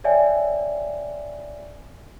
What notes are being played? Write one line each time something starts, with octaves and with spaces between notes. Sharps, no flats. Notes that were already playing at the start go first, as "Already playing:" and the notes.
C#5 D5 E5 G5 G#5